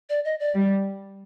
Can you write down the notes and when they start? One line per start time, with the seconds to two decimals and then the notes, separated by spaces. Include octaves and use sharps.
0.09 D5
0.25 D#5
0.40 D5
0.54 G3